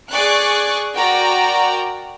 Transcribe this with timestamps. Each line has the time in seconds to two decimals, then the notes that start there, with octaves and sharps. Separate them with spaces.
0.10 G#4 D5 C#6 F#6
0.95 F#4 A#4 D5 G5 A#5